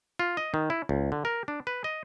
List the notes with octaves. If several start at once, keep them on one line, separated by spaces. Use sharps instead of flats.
F4
D#5
D#3
E4
C#2
D3
A#4
D4
B4
D#5